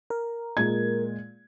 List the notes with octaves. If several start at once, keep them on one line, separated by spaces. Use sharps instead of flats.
A#4
A#2 G#3 G#6